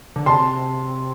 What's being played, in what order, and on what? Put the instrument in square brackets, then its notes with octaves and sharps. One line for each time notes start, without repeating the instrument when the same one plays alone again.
[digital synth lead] D3
[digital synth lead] C3 [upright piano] A5 C6